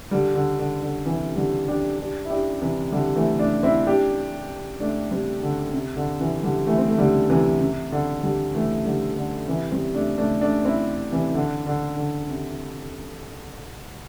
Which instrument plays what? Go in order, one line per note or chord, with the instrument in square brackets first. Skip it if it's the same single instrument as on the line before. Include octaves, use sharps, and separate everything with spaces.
[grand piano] D3 G3
D3
D3
D3
C3 E3
D3 G3
D4 G4
D4 G4
E4
D4 G4
C3 E3
D3 G3
E3 A3
A3 D4
C4 E4
D4 G4
A3 D4
G3 C4
D3
C3
D3
C3 E3
D3 G3
E3 A3
C4
A3
D3 G3
C3 E3
C3
D3
D3 G3
E3 A3
D3 G3
D3
C3 E3
G3 C4
A3 D4
A3 D4
A3 D4
C4 E4
C3 E3
D3
D3
D3
C3